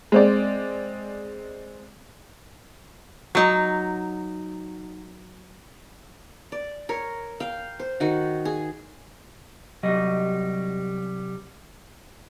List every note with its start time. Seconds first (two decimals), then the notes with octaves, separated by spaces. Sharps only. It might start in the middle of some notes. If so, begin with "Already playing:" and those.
0.12 G#3 C4 D5
3.35 F#3 D#4
6.52 D5
6.89 A#4 C#5
7.40 F5 G5
7.79 C5
8.00 D#3 F#4
8.45 G#4
9.83 C2 F#3 G3 D#5